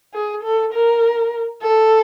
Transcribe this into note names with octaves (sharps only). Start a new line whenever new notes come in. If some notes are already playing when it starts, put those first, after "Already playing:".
G#4
A4
A#4
A4